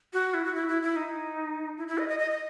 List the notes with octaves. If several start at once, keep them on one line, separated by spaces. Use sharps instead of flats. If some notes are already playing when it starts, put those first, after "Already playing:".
F#4
E4
F#4
E4
E4
E4
D#4
E4
E4
D#5
D#5
D#5
D#5